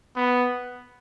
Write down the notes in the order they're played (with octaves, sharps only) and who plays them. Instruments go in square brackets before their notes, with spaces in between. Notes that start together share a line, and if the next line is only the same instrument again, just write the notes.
[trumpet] B3